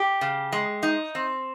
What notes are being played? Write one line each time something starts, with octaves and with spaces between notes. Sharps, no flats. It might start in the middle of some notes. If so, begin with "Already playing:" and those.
Already playing: G4
C#3
G#3
D#4
C4